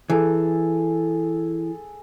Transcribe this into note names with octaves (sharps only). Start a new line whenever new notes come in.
E3 G#4 A4